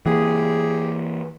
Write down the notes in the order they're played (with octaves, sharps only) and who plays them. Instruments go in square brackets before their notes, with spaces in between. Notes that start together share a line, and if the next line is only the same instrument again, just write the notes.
[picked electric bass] E3 A#3 [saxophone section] G4 G#4